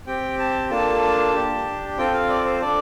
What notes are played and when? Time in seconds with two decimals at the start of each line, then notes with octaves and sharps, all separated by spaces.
0.07 C4 G4 G5
0.39 A5
0.70 A#3 D4 F4 A4 A5
1.34 D4 G4
1.98 C4 F4 A4 G5
2.14 F5
2.29 D5
2.45 C5
2.61 D4 A4 D5